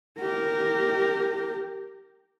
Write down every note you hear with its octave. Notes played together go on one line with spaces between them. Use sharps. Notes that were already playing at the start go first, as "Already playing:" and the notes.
G4 A#4